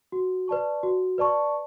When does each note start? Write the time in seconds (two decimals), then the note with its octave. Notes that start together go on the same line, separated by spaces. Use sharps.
0.12 F#4
0.48 B4 D5 A5 C#6
0.83 F#4
1.18 B4 D5 A5 C#6